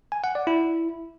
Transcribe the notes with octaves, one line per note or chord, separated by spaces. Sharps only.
G#5
F#5
D5
E4